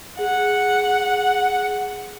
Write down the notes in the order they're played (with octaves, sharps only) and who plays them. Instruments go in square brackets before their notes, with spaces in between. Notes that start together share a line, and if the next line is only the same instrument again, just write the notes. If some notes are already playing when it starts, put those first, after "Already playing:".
[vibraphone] G#4 [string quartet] F#5